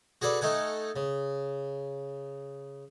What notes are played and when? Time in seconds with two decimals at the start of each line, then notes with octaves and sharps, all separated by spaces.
0.22 F#4 G#4 A4 B4 D5
0.41 A3 D#4 A4 F#5 G#5
0.96 C#3